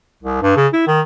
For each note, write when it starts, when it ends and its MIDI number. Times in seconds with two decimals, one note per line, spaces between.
0.23 0.41 36
0.42 0.53 43
0.56 0.67 49
0.73 0.87 64
0.87 1.01 51